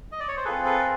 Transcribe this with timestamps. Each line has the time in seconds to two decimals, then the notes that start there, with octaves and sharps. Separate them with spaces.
0.12 D#5
0.20 D5
0.28 C#5
0.37 C5
0.45 C4 F4 G#4 A4 B4
0.65 A4 B4
0.79 A#4